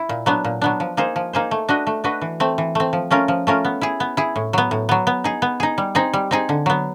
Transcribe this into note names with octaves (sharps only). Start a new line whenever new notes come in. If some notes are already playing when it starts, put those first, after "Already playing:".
Already playing: E4
A#2
F#3 B3 D4
A#2
F#3 B3 D4
F3
A#3 D#4 G#4 C5
F3
A#3 D#4 G#4 C5
A3
D4 F#4 B4 D#5
A3
D4 F#4 B4 D#5
E3
A3 C4
E3
A3 C4
F3
A3 C#4 F4 A#4
F3
A3 C#4 F4 A#4
B3
E4 G#4
B3
E4 G#4
A2
F#3 B3
A2
F#3 B3
B3
D#4 G#4
B3
D#4 G#4
G3
C4 D#4 G#4
G3
C4 D#4 G#4
D3
F#3 B3